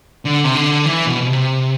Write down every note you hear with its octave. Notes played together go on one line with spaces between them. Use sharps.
D3
C3
D3
E3
B2
B2
C3